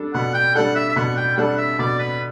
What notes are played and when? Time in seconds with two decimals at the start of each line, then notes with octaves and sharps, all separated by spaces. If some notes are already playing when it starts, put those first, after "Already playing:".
Already playing: G3 D4 A4
0.13 B2 F#5
0.34 G5
0.55 G3 D4 A4 F#5
0.75 E5
0.89 E5
0.96 B2 F#5
1.17 G5
1.37 G3 D4 A4 F#5
1.57 E5
1.79 B2 D5
1.99 B4